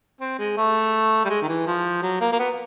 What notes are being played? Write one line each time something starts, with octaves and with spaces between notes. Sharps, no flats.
C4
G#3
A3
G3
G#3
D#3
E3
F3
F#3
A#3
A#3
B3